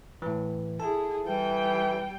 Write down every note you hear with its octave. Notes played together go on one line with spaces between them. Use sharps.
A2 E3
E4 G#4 A4 A5
E3 G3 G5